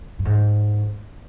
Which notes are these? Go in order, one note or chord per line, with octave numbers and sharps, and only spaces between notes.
G2
G#2